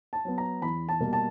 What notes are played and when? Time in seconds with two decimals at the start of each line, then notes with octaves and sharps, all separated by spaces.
0.13 A5
0.25 F#3 B3
0.38 A#5
0.62 E2 B5
0.89 A5
1.00 B2 G3 A#3
1.13 A5